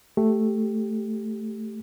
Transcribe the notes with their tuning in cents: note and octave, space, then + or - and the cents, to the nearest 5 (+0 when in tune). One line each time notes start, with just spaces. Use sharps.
A3 +0 G4 +0